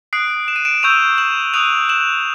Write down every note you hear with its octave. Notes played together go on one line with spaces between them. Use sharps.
D#6 F#6 C7 D7
E7
D#7
D7 E7
C#6 E6 G6 D#7 F7
E7 F#7
D#6 F#6 D#7 F7
E7 F#7